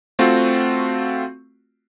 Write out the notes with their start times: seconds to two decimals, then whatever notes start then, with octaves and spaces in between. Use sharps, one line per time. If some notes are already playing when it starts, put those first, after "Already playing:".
0.19 A3 C4 F4 F#4